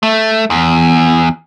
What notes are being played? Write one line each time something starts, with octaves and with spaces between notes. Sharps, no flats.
A3
E2